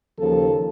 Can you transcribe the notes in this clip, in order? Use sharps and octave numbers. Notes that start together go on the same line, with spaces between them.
D#2 C#3 F3 A4